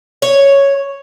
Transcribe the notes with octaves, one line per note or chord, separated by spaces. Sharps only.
C#5